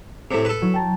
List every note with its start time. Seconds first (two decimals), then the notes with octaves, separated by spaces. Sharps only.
0.31 A2 C3
0.45 A4 B4
0.62 F#3 E4
0.74 G5 A5 A#5